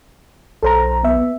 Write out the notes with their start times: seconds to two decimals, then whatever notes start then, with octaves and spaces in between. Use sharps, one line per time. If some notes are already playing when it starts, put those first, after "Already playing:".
0.63 B1 A4 C5 A#5
1.04 B3 E5